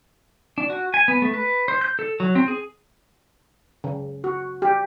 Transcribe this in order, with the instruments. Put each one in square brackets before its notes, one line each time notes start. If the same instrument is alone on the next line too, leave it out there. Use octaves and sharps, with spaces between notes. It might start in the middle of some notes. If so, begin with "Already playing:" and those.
[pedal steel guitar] D4
F#4
G#5
B3
A3
B4
C5
G6
A4
F#3
C4
G#4
[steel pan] C#3
F#4
G4